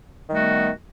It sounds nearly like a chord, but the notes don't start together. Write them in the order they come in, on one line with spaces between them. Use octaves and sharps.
D#3 G3 A3 F#4 B3